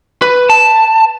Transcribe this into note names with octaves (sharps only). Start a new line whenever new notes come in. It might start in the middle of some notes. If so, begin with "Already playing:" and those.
B4
A5